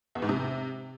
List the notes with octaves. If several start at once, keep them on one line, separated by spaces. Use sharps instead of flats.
E2
G#2
C3